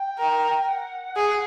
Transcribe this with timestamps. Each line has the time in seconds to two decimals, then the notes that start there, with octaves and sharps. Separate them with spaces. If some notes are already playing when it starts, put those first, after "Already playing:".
Already playing: G5
0.19 A#4
0.68 F#5
1.16 G#4